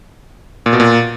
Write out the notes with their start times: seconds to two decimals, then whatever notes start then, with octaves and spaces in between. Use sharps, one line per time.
0.66 A#2
0.73 B2
0.80 A#2